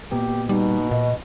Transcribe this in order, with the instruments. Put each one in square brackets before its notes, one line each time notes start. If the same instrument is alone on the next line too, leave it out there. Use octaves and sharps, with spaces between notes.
[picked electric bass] A#2 A#3 B3 [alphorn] G4
[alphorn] B2 [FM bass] G3 [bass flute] D#4
[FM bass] A#2 [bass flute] D#5